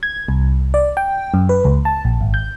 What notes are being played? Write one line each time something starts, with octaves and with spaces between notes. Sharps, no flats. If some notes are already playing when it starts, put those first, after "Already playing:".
G#6
C2
D5
G5
F#2
B4
C#2
A5
A#1
G#1
G6